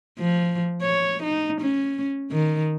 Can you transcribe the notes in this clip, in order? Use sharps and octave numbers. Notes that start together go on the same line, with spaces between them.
F3
C#5
D#4
C#4
D#3